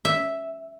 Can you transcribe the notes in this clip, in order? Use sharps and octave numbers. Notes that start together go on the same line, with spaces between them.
E5